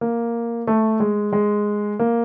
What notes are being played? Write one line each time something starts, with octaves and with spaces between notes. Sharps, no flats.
A#3
A3
G#3
G#3
A#3